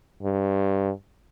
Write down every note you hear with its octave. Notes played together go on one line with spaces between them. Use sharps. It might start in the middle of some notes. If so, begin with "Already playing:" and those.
G2